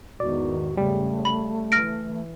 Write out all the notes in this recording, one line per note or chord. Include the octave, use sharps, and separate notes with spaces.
E2 G#2 D#3 F#4 D5
C#3 G3 A3
B5
E3 F6 A#6 D7